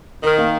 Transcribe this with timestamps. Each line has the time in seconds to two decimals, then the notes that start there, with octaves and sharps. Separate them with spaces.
0.23 D#3 A#4
0.38 A#3